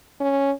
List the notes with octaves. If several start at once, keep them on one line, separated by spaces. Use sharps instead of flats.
C#4